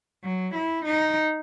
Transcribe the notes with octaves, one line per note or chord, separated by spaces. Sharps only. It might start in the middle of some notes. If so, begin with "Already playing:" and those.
F#3
E4
D#4